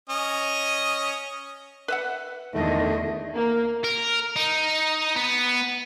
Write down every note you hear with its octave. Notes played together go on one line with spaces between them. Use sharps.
C#4 D#5
B4 E5 F#5
E2 B2 D3 D#3 A3 D#5
A#3
A#4
D#4
B3